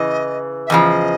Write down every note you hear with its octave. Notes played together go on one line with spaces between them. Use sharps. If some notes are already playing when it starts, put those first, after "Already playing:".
Already playing: C#3 E3 D#5
E5
E2 C#3 F3 D#5